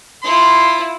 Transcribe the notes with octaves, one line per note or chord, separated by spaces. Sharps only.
E4 F4 C6